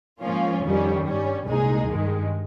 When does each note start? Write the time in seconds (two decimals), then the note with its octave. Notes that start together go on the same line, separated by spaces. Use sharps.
0.21 G#2 F3 A#3 C#4 F4
0.63 F2 D#3 G3 C#4
1.04 G2 G3 C#4
1.46 C2 A#2 G#3 D#4 G#4
1.88 G2 D#3 G#3